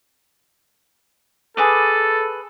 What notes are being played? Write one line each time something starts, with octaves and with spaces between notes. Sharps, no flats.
G#4 A4 B4 D6